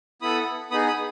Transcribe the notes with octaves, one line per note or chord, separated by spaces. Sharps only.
B3 E4 A4 B5 D#6
B3 D#4 G#4 B5 D#6
B5 D#6